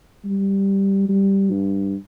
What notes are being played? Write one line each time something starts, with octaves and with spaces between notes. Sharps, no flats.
G3
G3
G2